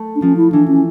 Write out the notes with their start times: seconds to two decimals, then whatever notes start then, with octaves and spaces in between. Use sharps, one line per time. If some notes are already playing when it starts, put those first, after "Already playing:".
Already playing: A3
0.16 D4
0.22 F3 C#4
0.37 E4
0.52 E3 D4
0.68 C#4